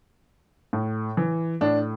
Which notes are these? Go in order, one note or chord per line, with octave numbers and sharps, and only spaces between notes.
A2
E3
A2 D4